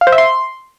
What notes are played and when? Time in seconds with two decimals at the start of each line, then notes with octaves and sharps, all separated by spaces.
0.01 F5
0.07 C5
0.12 E5
0.18 C6